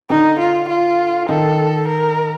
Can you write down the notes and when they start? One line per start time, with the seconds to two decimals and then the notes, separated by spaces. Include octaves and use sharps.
0.09 D3 D#4
0.39 F4
0.69 F4
1.29 D#3 A4
1.88 A#4